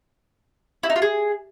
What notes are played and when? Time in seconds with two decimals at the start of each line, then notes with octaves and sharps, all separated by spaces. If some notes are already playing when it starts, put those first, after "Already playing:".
0.83 E4
0.90 D#4
0.96 F4
1.02 G#4